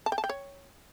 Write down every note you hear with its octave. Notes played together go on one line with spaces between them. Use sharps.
A5
G5
A5
G5
C#5